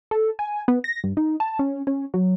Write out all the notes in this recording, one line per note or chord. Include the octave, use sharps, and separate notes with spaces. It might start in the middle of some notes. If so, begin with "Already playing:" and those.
A4
G#5
B3
A#6
G2
D#4
A5
C#4
C#4
F#3